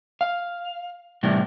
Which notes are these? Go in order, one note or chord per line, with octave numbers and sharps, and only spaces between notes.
F5
A2 C3 E3 G3